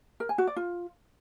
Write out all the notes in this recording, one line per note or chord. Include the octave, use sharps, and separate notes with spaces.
A#4
G#5
F#4
D5
F4